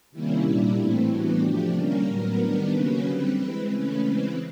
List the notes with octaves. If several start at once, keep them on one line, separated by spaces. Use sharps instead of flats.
C3 D#3 G3 A#3 C#4 E4
A#2 G3 A#3 D4
A2 E3 A3 C4
A2 E3 G3 B3 D4 F#4
C3 F3 A3 D4 G4
D3 G3 A#3 C#4 A#4
A2 F#3 B3
D#3 G3 B3 D4
C#3 F#3 A#3 C#4 B4
D3 G3 C4
E3 G#3 C4
C#3 E3 A3 C#4 B4
C#3 E3 G#3 C4